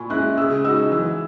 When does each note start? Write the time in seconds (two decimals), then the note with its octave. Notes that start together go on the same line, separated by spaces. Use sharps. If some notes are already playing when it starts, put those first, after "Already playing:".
Already playing: A#2 G#5 B5 C#6
0.10 G#3 C#4 E4 F#6
0.37 C#3 E6
0.64 G#3 D#4 F#4 E6
0.92 E3 E6